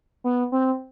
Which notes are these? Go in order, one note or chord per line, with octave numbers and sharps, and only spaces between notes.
B3
C4